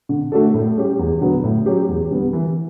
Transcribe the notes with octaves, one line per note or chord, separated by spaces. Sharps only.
D3
A3 D4 F#4 A4
A2
G3 C#4 G4
E2
D3 F#3 B3
A2
F#3 C#4 G4
E2
D3 G3 B3
E3